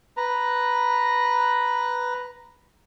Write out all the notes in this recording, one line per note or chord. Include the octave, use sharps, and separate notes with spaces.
B4 A#5